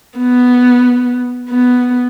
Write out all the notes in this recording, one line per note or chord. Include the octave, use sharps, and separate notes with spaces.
B3
B3